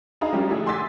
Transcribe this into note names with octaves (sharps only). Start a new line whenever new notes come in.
D4 D#4 G#4 D#5 F5 A#5
F3 G3 C#4 F#4 G4 A#4
A2 D3 A3 D4 G#4 A4
G#5 C6 D6 E6 A6 B6